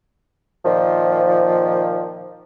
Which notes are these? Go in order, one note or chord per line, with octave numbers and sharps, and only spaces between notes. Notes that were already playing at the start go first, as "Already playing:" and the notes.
A#2 D#3 F3